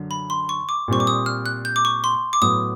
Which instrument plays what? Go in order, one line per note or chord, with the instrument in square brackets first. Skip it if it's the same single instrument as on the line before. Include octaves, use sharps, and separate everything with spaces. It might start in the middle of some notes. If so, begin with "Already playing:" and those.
Already playing: [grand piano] F#2 D3
[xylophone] B5
C6
C#6
D6
[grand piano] A#2 G3 C4 [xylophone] C#6
[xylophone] D6
D#6
F6
F#6
G6
D6
C#6
C6
D6
[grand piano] A2 F#3 B3 [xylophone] D#6